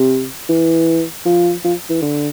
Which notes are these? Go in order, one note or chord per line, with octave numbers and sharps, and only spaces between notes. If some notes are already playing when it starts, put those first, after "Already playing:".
Already playing: C3
E3
F3
F3
E3
D3